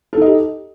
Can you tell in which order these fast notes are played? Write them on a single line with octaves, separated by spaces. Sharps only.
A4 D#4 D#5 G4